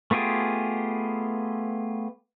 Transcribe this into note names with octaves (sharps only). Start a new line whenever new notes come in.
A3 B3 F4 G4 G#4